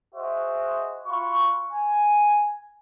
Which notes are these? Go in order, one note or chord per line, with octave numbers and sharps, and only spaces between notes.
F#4 G#4 C5 D#5 E5
F4 F#4 B5 C#6
G#5